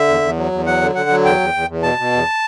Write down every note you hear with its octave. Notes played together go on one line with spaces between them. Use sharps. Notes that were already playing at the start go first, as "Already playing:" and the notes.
Already playing: D3 E5
E2
E2
F#3
E2
F#3 F#5
D3
D3 F#5
F#3
E2 G5
E2
E2
E2
B2 A5
B2
E2